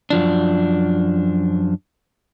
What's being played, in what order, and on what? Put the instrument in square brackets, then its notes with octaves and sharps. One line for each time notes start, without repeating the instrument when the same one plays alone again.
[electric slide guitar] F#2 F3 D4